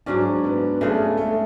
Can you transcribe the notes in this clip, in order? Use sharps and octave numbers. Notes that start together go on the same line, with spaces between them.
G#2 F#3 C#4 D4
B3
C#3 G#3 A3 D4 G#4
A3